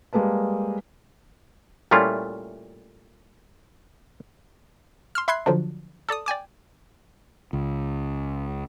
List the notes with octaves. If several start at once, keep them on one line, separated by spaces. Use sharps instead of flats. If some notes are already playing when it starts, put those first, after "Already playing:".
G3 G#3 A#3 B4 A5
A#2 G3 A3 C#4 E4 F4
C6 E6 F6
E5 B5 C6 F#6 G#6 C7
D3 F3 F#3 D4
A4 D5 A5 D#6
D5 G5 G#5 D6
C#2